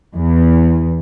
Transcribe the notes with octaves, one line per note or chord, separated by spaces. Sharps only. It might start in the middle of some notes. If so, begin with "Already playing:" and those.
E2